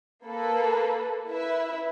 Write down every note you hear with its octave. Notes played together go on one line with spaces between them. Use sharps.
A#3 A4 B4
E4 B4 E5